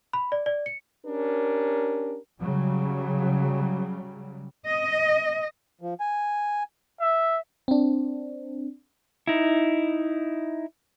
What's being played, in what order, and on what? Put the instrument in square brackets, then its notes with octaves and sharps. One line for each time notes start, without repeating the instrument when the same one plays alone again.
[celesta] B5
D5
D5
C#7
[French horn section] C#4 D4 G4 A#4
[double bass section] C#3 F#3 G3
[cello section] D#5
[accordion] F3
G#5
[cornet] E5
[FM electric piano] C4 D4
[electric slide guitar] D#4 E4